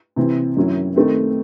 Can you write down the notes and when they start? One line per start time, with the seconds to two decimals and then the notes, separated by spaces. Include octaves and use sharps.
0.16 C3 E3 C4 E4
0.56 F#2 D#3 F#3 C#4 E4
0.96 D#3 A3 C4